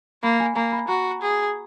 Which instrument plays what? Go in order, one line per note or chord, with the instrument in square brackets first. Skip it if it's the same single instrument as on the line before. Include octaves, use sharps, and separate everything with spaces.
[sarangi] A#3 [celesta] B5
[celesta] G#5
[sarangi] A#3 [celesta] A#5
[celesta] B5
[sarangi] F#4 [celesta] A#5
[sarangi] G#4